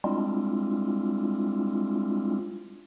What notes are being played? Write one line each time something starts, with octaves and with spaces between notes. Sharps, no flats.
G3 G#3 C4 D4 E4 F4